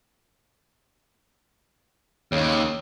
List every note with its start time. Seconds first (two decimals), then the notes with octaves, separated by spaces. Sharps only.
2.32 D#2 C#3